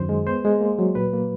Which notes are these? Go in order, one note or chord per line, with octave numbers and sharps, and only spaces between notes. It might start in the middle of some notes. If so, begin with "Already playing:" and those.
Already playing: F#2 D#3 C5
G#3
B3 C5
G#3
A#3
F#3
A#2 B4
A#3